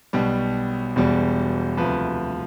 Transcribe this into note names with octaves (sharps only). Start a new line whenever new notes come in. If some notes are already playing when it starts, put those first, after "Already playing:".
B1 B2 G3
E1 E2 B2 G3
D2 C3 F3 B4